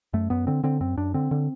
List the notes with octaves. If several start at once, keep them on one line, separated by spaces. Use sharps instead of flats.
F#2 A3
F#2 B3
D3 C4
D3 C4
F#2 C4
F#2 D4
D3 C4
D3